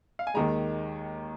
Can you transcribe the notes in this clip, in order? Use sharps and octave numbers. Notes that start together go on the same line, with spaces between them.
F5
G#5
D#2 D#3 G#3 A#5